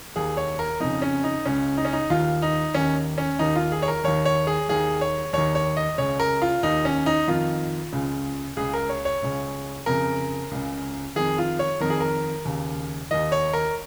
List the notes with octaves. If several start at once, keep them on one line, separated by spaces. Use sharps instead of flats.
D#2 D#3 G#4
C#5
A#4
F2 C#3 D#4
C#4
D#4
C#2 C#3 C#4
D#4
C#4
D#4
D#2 D#3 F4
D#4
D#2 D#3 C#4
C#4
D#2 D#3 D#4
F4
G#4
C#5
A#4
D#2 D#3 C#5
C#5
G#4
D#2 D#3 G#4
C#5
D#2 D#3 C#5
C#5
D#5
C#2 C#3 C#5
A#4
F4
D#2 D#3 D#4
C#4
D#4
F2 D#3 F4
C#2 C#3
C#2 C#3 G#4
A#4
C#5
C#5
C#2 C#3
F2 C#3 A#4
C#2 C#3
F2 D#3 G#4
F4
C#5
F2 D#3 A#4
G#4
A#4
D#2 C#3
D#2 D#3 D#5
C#5
A#4